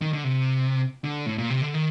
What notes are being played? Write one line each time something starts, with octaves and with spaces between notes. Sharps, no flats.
D#3
D3
C3
D3
A2
A#2
C3
D3
D#3